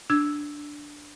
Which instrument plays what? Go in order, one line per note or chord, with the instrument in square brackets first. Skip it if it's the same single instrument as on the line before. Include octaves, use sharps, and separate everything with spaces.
[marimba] D4 E6 G#6